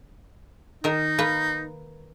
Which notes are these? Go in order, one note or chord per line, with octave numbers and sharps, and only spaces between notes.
D#3 D#4 A#4
A#3 B4